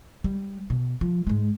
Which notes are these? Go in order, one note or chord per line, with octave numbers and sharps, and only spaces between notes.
G3
B2
F3
G#2 G#3